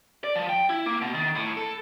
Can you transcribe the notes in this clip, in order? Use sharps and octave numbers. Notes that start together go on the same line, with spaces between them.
D5
F3
G5
E4
A#3
B2
D#3
A2
A4